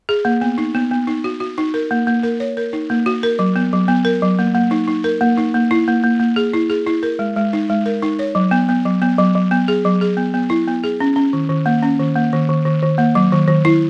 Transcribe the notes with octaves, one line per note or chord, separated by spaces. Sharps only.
G#4
A#3
B3
D#4
B3
B3
D#4
F#4
F#4
D#4
A#4
A#3
A#3
A#4
C#5
A#4
D#4
A#3
F#4
A#4
F#3
B3
F#3
B3
A#4
F#3
A#3
A#3
D#4
D#4
A#4
A#3
D#4
A#3
E4
A#3
A#3
A#3
G#4
E4
G#4
E4
A#4
G#3
G#3
D#4
G#3
A#4
D#4
C#5
F#3
B3
B3
F#3
B3
F#3
F#3
B3
G#4
F#3
G#4
B3
B3
E4
B3
G#4
C#4
C#4
D#3
D#3
A#3
C#4
D#3
A#3
D#3
D#3
D#3
D#3
A#3
F#3
D#3
D#3
E4